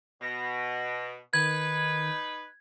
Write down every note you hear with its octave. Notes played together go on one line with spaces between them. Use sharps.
B2 A#6
D#3 D#4 B4 G#6